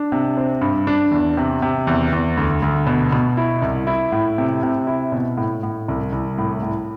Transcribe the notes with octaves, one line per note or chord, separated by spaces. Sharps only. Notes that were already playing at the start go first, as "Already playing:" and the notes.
Already playing: D4
C3
C4
G2
D4
E2
C3
C3
E2
E2
D2
D2
B2
B2
E4
C2
E4
A2
C3
C3
E4
B2
A2
A2
C2
C2
A2
A2